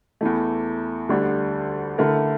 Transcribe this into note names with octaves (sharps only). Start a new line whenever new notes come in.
E2 E3 A3
D2 D3 G3 D4
D3 A3 E4 A#4